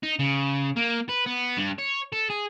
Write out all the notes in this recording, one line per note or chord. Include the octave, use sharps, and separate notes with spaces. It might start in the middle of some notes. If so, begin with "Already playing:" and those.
D#4
C#3
A#3
B4
B3
G2
C#5
A4
G#4